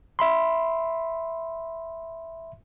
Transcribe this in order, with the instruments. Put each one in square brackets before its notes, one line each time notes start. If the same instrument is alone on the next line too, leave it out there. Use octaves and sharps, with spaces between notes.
[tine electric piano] E5 B5 C6